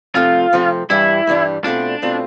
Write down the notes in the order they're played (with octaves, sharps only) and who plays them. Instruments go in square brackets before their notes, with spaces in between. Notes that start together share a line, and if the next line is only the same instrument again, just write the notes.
[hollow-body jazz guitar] C3 F3 A3 C4 [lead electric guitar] F4
[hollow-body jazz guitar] C3 F3 A3 C4
[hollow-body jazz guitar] G2 E3 G3 D4 [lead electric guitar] E4
[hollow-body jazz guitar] G2 E3 G3 D4
[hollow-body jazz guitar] B2 A3 C4 F4 [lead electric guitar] D4
[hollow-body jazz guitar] B2 A3 C4 F4